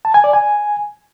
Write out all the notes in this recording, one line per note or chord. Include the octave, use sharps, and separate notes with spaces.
A5
G#5
D5
G#5